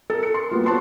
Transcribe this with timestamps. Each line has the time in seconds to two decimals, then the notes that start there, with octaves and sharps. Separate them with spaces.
0.10 A4 A#4
0.23 C#7
0.34 C6
0.51 G3 A#3 B3 F4
0.66 F#4 C5 A5 C6